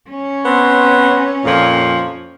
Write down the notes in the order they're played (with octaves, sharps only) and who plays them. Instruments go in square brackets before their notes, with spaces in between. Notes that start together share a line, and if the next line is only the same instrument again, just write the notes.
[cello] C#4
[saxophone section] B3 C4
F2 A#2 F3